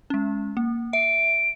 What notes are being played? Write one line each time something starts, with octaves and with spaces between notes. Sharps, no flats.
G#3 C#4
A#3
E5 D7